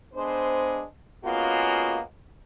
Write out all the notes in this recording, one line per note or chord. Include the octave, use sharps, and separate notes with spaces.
G#3 B3 D4 C5
G#3 A#3 B3 C#4 F4 F#4